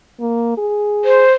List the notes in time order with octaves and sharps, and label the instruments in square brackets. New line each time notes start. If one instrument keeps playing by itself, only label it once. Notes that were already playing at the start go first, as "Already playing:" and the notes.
[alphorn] A#3
G#4
[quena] C5